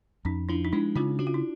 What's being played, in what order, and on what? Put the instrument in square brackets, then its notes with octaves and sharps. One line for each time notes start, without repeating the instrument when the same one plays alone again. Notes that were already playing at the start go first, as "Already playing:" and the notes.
[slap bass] F2 [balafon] C#4 D#4
[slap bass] F3 [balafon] D4 E4
[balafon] D#4
[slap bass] G#3 [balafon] D4 E4
[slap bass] C#3 [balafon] D#4 F4
[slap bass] D4 [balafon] F#4
[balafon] F4
E4